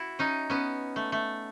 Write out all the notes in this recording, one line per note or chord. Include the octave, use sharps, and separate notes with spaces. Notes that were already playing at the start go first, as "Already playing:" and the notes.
Already playing: E4 F#4
C#4 D#4
B3 C#4
A3
A3